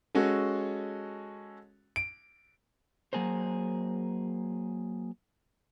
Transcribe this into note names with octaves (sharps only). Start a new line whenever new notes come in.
G#3 C#4 F#4 A4
D7
F#3 A#3 G#4 A#4 C5